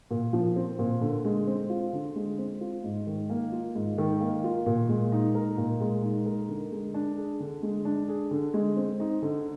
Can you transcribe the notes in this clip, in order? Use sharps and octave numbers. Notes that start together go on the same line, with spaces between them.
A#2
F3
C4
A#2
D3
G#3
C4
F4
D3
G#3
C4
F4
G#2
D#3
A#3
F4
G#2
D#3
A#3
F4
A#2
G#3
D#4
A#4
A#2
G#3
D#4
A#4
D3
G#3
D4
G#4
D3
G#3
D4
G#4
D3
G#3
C4
D#4
D3